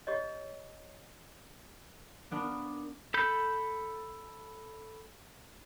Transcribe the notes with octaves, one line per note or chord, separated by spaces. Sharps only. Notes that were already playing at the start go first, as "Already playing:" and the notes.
G4 C#5 D#5
A#3 B3 D4
A4 B5 G6